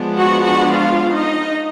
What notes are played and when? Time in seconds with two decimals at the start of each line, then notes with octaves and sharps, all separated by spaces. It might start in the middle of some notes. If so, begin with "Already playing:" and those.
Already playing: F3 G#3 B3 D4
0.18 F#4 F#5
0.45 F#4 F#5
0.74 F4 F5
1.16 D#4 D#5